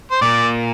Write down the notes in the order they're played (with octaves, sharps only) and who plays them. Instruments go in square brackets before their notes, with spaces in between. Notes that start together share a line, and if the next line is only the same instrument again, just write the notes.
[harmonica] C5
[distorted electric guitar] A#2 [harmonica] D5